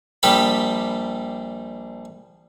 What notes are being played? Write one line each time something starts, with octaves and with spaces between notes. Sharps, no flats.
A#1 G3 G4 B5